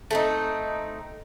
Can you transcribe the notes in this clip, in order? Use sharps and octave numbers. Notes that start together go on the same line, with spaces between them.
A3 C4 D#4